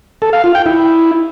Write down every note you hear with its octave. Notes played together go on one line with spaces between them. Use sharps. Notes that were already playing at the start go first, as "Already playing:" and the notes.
A4
F5
F4
G5
E4